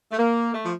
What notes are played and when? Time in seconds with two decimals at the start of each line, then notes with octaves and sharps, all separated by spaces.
0.11 A3
0.18 A#3
0.53 A3
0.63 F3